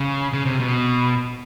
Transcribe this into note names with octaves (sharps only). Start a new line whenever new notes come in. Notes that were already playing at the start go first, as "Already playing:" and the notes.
Already playing: C#3
C#3
C3
B2